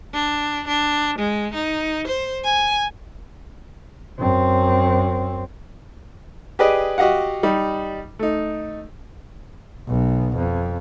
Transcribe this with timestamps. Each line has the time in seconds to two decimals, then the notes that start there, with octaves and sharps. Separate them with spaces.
0.14 D4
0.67 D4
1.18 G#3
1.54 D#4
2.07 C5
2.44 G#5
4.19 F#2 C4
6.59 G4 G#4 B4 D5 D#5
6.98 F#4 G4 D#5 F5 F#5
7.43 G3 D#4
8.19 A3 D#4
9.89 B1 B2
10.37 F2